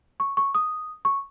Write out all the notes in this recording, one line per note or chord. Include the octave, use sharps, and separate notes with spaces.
C#6
C#6
D#6
C#6